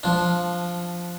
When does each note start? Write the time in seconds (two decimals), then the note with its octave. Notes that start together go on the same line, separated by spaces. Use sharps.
0.03 F3 D4